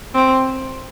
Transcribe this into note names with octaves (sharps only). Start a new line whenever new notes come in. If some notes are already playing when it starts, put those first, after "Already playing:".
C4